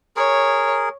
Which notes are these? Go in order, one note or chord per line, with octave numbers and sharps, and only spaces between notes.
G#4 A#4 C#5